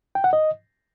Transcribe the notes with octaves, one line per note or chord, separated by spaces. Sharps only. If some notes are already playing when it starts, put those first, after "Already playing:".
G5
F#5
D#5